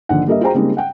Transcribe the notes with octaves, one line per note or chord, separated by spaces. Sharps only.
A#1 D3 D#3 F#5
G3 A#3 A#4 D#5 E5
F4 F#4 G#4 C5 G5 A#5
C#3 G3 G#3 A#3 C4 D#4
F#5 G5